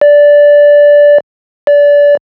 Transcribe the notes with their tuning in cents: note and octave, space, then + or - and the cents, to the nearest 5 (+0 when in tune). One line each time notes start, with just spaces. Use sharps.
D5 -10
D5 -25